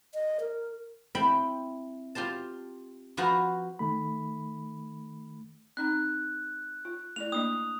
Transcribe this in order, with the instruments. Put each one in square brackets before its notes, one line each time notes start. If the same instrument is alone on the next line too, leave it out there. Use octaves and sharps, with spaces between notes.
[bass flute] D#5
A#4
[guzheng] C4 E4 G5 B5
F4 G4 C5 A5
F3 F#4 B4 C5 A#5
[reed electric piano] D#3 A3 B5
[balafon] C4 D#4 A#5 [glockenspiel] F#6
[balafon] F4
[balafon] A3 E4 D5 [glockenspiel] F7
[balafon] A#3 D4 D#5 [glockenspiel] D#6